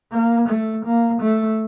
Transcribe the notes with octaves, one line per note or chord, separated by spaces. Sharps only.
A#3
A3
A#3
A3